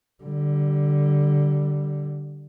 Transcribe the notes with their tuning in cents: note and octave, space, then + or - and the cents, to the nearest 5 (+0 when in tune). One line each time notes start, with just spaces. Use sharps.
D3 +0 G3 -20